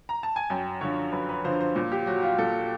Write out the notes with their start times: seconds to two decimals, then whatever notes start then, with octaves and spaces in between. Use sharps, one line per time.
0.09 A#5
0.23 A5
0.36 G#5
0.50 F#2 G5
0.81 D3 F3 C#5
1.12 F#2 B4
1.29 B4
1.44 D3 F3 C5
1.61 C5
1.76 A#2
1.92 G4
2.07 F#3 F#4
2.23 F4
2.38 A#2 A4